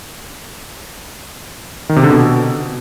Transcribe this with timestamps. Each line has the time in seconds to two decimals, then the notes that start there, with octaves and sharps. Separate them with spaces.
1.89 D#3
1.96 C3
2.03 D3
2.10 B2